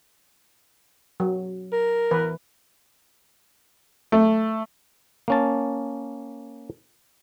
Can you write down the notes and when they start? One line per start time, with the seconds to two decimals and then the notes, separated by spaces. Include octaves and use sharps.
1.20 F#3
1.72 A#4
2.11 E3 B4
4.12 A3
5.28 A#3 C#4 A5